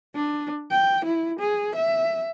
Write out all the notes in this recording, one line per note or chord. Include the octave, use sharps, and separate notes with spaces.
D4
G5
E4
G#4
E5